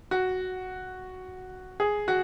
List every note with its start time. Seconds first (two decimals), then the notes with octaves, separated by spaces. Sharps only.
0.11 F#4
1.80 G#4
2.08 F#4